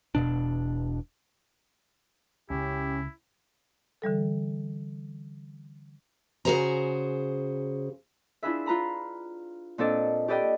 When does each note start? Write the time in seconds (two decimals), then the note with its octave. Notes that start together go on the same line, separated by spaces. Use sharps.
0.15 E1 B2 D4
2.50 C#2 C#3 C#4 E4 G4
4.02 D3 E3 G3 A4
6.45 C#3 F#4 G#4 A#4 C5 A#5
8.43 D4 E4 F4 G#4 B4 E5
8.66 F4 B4 A#5 B5
9.78 A#2 C4 D4 A4 D5 D#5
10.28 G4 A4 B4 D5 D#5 G5